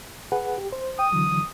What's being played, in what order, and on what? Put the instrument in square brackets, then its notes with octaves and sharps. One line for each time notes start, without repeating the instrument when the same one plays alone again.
[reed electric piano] G#4 B4 F#5
G4
C5
[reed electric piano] G5 [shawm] D#6
[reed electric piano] D3 E3 F#3